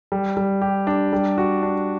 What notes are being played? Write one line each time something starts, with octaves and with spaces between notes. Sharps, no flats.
G3
G3
G4
D4
G3
F#4
D4